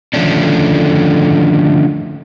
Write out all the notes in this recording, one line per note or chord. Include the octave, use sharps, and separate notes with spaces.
D3 D#3 F3 A3 C#4 D4